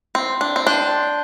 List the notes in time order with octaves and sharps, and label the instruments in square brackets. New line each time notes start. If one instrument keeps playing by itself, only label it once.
[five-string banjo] C4
D4
C4
[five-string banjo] D4 [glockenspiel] A5 C6 G6 C7 G7